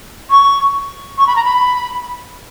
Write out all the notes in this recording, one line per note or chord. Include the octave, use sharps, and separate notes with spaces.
C#6
C#6
B5
A#5
B5